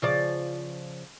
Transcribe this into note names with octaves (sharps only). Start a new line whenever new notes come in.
C#3 F3 D5